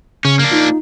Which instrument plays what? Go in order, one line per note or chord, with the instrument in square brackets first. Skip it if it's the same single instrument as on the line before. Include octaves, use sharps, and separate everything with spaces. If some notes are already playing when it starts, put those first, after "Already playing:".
[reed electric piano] C#3 [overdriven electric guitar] C#4
[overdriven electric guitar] A#3 D4
[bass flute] D#4 [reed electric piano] F4